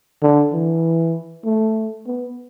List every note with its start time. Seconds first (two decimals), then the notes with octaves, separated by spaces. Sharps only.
0.22 D3
0.53 E3
1.44 A3
2.06 B3